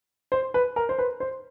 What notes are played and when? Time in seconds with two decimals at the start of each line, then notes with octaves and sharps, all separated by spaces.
0.32 C5
0.54 B4
0.76 A#4
0.89 C5
0.99 B4
1.20 C5